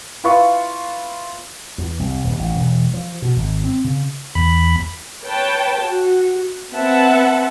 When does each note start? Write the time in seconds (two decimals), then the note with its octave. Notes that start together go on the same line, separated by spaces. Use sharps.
0.24 E4 F4 B4 F5 C#6
1.78 E2
2.00 C2
2.24 D#1
2.39 A1
2.56 E1
2.94 F3
3.22 B2
3.36 G#1
3.64 C4
3.84 C#3
4.35 E2 B5
5.26 B4 C#5 G5 A5
5.82 F#4
6.74 C4 B4 E5 F#5 A5